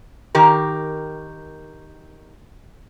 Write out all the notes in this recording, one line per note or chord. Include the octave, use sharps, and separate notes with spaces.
D#3 G4 A#4